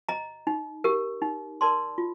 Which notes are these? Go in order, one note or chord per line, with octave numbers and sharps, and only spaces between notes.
D#5 A#5
D#4
G4 A#4
D#4
A#4 D5 A5 C6
F4